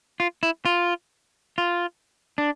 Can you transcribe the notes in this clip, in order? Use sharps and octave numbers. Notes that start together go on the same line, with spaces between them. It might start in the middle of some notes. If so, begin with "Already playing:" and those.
F4
E4
F4
F4
D4